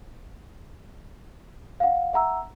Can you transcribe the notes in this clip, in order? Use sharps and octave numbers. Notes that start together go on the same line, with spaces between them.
F5 F#5
E5 F#5 A#5 E6